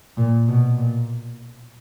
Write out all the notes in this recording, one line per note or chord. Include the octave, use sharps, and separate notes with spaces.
A#2
B2
A#2